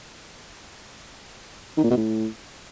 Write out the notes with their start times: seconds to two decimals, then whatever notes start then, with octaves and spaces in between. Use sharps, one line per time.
1.78 D#3
1.84 A#2
1.90 B2
1.97 A2